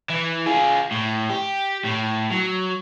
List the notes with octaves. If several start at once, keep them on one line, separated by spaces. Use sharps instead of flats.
E3
F4 G#4
A2
G4
A2
F#3